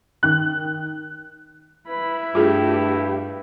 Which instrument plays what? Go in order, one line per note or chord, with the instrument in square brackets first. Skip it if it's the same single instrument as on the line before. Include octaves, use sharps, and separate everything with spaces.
[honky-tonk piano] D#3 F#6
[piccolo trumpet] E4 [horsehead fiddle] B4 B5
[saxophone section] G2 [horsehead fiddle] A3 G4 [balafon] F4 G#4